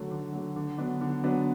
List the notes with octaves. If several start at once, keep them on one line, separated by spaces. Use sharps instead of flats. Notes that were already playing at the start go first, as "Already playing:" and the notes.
Already playing: D3 F#3 A3
D3
F#3 A3
D3
F#3 B3 D4
D3
F#3 B3 D4